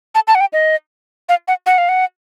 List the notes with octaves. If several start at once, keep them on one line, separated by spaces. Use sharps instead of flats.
A5
A5
F#5
G5
D#5
F5
F#5
F#5
F5
F#5